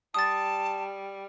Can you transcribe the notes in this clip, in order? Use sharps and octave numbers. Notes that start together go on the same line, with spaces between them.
G3 A5 D#6 A6